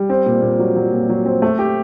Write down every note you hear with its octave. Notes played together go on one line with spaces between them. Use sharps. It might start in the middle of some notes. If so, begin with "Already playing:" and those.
Already playing: G3
C4
A#2
A#2
F#3
F#3
A#2
F#3
C4
A3
G4